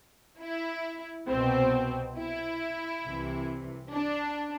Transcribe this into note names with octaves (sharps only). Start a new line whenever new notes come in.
E4
C2 B2 C4
E4
C2 C3 E3
D4